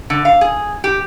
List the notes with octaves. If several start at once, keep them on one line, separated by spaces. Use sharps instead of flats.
D3
F5
G#4
G4